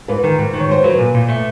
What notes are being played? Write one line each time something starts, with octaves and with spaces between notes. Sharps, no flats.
G#2 B4
D#3 A#4
G#2 A#4
D#3
C#5
G#2 C5
F#3 B4
A#2
A#2
A3